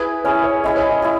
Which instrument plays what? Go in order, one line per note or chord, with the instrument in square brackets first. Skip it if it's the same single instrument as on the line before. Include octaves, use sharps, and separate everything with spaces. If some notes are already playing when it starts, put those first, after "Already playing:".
Already playing: [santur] E4 G#4 [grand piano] B4
[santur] C#4 E4 G#4 [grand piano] C#5
[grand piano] C#5
[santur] C#4 E4 G#4 [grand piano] D#5
[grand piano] C#5
D#5
[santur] E4 G#4